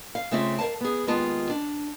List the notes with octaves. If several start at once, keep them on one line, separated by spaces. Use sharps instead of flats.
F5
C#3 A3 C4 F4 E5
A#4 C5 F5 A5
B3 G#4
D#2 G#3 B3 F4 A5
D4